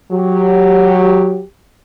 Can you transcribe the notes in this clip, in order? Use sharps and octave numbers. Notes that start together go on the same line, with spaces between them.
F#3 G4